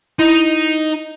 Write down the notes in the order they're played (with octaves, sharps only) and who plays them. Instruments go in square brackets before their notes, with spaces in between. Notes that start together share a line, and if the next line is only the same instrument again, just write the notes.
[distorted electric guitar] D#4 [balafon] E4